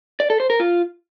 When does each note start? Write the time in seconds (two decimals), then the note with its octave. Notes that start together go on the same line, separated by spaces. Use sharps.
0.20 D5
0.30 A4
0.40 C5
0.50 A#4
0.60 F4